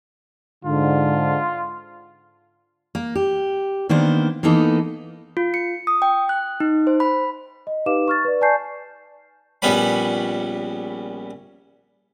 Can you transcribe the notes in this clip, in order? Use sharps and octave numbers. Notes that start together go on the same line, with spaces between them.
G#2 D3 F4
A#3
G4
D#3 A#3 B3 D4 C5
E3 A#3 B3 D#4 A4
F4
C#7
D#6
G5
F#6
D#4
C5
B5
D#5
D#4 G4 B4 F5 D6 E7
C#6 F6 A6
B4 D5
D5 G#5 A5 C#6 G6 C7
A#1 G3 B3 C#4 B5